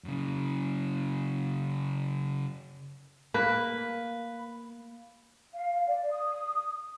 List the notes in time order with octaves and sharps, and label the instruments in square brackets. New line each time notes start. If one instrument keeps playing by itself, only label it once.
[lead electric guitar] F#2 C#3
[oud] A#3 [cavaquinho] B4
[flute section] F5
D5
D#6